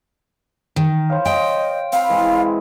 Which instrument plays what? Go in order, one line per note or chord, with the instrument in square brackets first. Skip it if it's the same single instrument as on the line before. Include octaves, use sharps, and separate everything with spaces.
[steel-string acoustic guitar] D#3
[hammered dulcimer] C5 C#5 F5
[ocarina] D#5 [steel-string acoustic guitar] G5
[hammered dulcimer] C4 B5 [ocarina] F5
[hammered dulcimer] E3 G#3